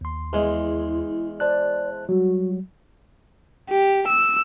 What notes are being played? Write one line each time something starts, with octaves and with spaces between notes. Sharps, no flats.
D#2 C6
E2 G#3 E4
C5 D5 A5 F#6
F#3 G3 F#4
G4
E6